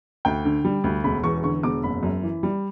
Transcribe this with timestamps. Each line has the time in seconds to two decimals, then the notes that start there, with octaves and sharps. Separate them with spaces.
0.25 D2 G5
0.45 D3
0.65 G3
0.84 D2
1.04 E1 B5
1.23 E2 C#6
1.44 D3 C#6
1.63 E1 D6
1.84 F#1 B5
2.03 F#2
2.23 E3
2.43 G3